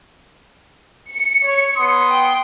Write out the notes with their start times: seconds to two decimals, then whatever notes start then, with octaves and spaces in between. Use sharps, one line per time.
1.11 C#7
1.44 C#5
1.77 B3 C6 D#6
2.10 G5